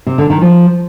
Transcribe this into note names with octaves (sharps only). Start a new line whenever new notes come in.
C3
D3
D#3
F3